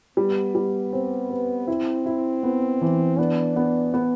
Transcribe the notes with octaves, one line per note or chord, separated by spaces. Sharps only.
G3 B3
G3
C4
B4
C4 E4
E4
B3
E3
B3 D4
B3
B3